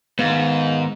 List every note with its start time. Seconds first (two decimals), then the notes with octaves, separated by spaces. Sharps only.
0.19 G#2 D#3 B3 F5